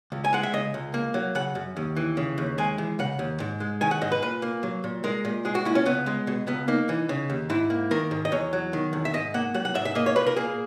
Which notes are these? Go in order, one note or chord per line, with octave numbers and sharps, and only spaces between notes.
C#2
G#5
G#3 F#5
E5
C#3 D#5
C#2
A#3
F#3
C#3 F#5
F#2
D#2
E3
C#3
D#2
G#3 G#5
E3
C#3 F#5
D#2
G#2
G#3
D#3 G#5
F#5
G#2 D#5
B4
A#2 B4
A#3
F#3
A#2
G#3 A#4
A#2
G#3 G#4
F#4
A#2 E4
C#4
C#2 B3
G#3
B2
C#2 B3
A#3 D#4
E3
C#3
D#2
G#2 E4
A#3
D#3 A#4
G#2
D#5
E2 C#5
F#3
D#3
E2
E5
G#2 D#5
A#3 F#5
F#3 F#5
F#5
G#2 E5
E5
A#3 D#5
C#5
A#2 B4
A#4
A#3 G#4